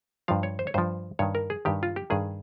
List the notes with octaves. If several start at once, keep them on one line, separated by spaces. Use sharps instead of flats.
G2 F3 F5
C#5
C5
C#5
G2 F3 C5
G2 D#3 C#5
A#4
G#4
G2 D#3 G4
F4
G4
G2 D#3 G#4